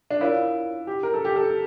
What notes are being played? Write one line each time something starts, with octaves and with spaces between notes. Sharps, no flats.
D4
E4 F4 A#4 C#5 F5
G4
A#4
A4
G4
A4